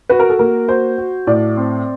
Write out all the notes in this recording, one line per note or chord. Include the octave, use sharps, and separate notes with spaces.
F#4 B4
A#4
A4
A#3 A#4
F#4 C5
F#4
A2 D5
C4